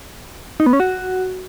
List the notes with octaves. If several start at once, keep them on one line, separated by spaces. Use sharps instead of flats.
D#4
B3
C#4
F#4